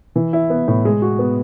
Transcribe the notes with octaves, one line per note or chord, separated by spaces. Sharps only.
E3
E4
B3
A2
G#3
F#4
B3